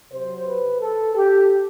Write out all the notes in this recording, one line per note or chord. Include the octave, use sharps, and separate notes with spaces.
C3 F#3 C5
B4
A4
G4